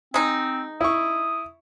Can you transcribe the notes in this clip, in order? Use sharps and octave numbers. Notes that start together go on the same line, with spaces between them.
G#3 C4 D#4
E4 C#6 D#6